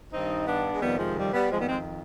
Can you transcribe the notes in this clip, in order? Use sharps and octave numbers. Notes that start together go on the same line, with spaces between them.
G2 D#3 C4 D#4
B3 D4
G#3
F2 C3 D#3 G3 B3
F3 G#3
G3
G3 B3
F2 D#3 F3 G#3
G3 B3
G#3 C4